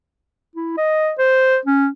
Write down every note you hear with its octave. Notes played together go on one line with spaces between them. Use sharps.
E4
D#5
C5
C#4